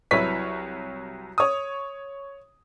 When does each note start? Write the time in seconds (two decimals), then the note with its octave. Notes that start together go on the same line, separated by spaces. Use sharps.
0.11 C2 F#3 E4 B4 C#5 B6
1.38 C#5 D#6